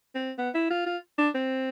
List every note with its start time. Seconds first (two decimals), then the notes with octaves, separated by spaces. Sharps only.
0.15 C4
0.38 B3
0.54 E4
0.70 F4
0.86 F4
1.18 D4
1.35 C4